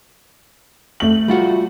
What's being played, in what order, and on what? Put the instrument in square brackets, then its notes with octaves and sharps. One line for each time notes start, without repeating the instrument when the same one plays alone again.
[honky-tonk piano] A3 F#7
[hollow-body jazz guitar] G3 F4 F#4